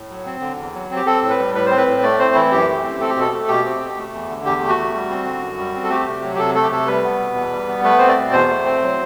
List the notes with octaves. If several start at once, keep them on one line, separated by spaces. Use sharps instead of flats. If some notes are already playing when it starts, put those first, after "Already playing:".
Already playing: A2
F#3
C4
D3
E2
F#3
C4
G4
C4 A4
A2
B4
G3
A2 B4
C4 C5
B4
A2
A3 D5
C4 C5
E3 E4
F#2 G4
A3
C4
C4 A4
G4
B2 A4
A3
B2 G4
C4
B2
A3
E2
D3
E2 G4
A3
F#4
E2
G3
C4
D3
F#2
G3
C4
A4
A3 G4
C3
F#3
G4
C3 A4
A3 A4
G4
C3 A4
G3 B4
B3
B2
E2
G3
B3
A3 B4
C4 C5
D5
B2
E2 C5
A3
C4
F#3